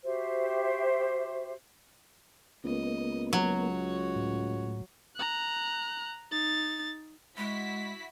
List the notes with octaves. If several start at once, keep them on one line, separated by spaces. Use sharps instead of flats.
F#4 G4 C5 E5
C#2 A#3 B3 D#5
F#3 F#4 C#5
A2
A#5 F#6
D#4 A6
G#3 E4 F#4 B6